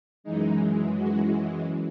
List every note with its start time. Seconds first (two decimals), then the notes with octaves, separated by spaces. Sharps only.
0.24 F#2 E3 G#3 D#4
0.96 F#4